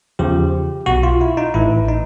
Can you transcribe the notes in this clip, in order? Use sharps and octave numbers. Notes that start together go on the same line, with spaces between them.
E2 C#3 F3 G4
B1 B2 F#4
F4
E4
D#4
A1 A2 E3 E4
D#4